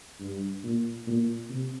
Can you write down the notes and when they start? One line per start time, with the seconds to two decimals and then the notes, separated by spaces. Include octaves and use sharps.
0.20 G2
0.63 A#2
1.07 A#2
1.50 C3